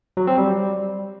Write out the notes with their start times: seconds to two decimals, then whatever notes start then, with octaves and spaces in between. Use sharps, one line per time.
0.17 F#3
0.27 C4
0.38 G3